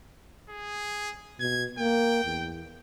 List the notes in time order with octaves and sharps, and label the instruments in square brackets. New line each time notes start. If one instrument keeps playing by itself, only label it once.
[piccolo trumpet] G#4
[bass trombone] B2 [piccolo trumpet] G#6
[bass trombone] A#3 [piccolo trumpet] G5
[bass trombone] E2